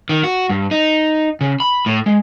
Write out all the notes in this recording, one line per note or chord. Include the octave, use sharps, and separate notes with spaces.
D#3
F#4
G2
D#4
C#3
B5
A2
G#3